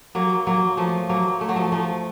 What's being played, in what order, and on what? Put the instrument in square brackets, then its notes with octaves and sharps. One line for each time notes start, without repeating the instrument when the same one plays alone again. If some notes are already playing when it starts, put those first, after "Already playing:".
[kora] F#3 A#3
F#3 A#3
F3 A3
F#3 A#3
A3
F#3
F3 A3
F3 A3